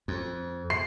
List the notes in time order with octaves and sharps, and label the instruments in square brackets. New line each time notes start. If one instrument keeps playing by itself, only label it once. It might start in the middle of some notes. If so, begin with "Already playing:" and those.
[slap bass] F2
[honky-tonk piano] C7